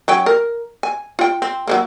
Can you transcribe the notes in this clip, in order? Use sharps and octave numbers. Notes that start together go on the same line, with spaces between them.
F#3 C#4 G5
A#4
G#5
F4 G5
C4
F#3 A3 A#3